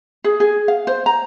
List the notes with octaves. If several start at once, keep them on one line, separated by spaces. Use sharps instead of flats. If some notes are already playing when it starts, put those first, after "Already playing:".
G#4
G#4
F5
C5
A#5